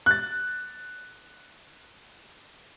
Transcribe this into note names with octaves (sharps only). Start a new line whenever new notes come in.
F#6 A6